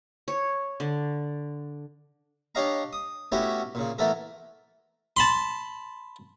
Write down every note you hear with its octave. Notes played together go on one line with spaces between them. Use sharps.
C#5
D3
D4 G4 C#5 D#5 F5 A#5
D#6
A3 B3 C#4 E4 F#4 G4
A#2 C#3
E3 A3 B3 A4 A#4
A5 B5 C6